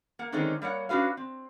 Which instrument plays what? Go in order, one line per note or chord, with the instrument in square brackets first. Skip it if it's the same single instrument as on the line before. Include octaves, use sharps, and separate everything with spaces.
[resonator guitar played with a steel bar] A#3 F#5
D3 D#3 G#3 C4 C#4 D#4
G3 A#3 C#5 F#5
C#4 D4 F#4 B4 F5
C4